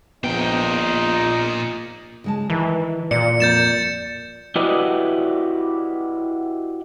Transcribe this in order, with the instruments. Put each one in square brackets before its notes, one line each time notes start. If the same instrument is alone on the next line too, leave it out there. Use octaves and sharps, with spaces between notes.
[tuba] A#1 [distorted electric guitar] A#2 G5 [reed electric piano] B3 [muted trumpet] D#4
[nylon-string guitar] C#3 G#3 A5
[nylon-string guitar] D#3 [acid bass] E3
[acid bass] A#2 [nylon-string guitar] D5 [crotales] C#7
[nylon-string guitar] F2 A#3 D5 [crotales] G6 A6 E7
[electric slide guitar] E4 F#4 G4 B4 D5 D#5